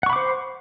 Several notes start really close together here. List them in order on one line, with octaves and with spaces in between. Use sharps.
F#5 C#6 B5 D6 C5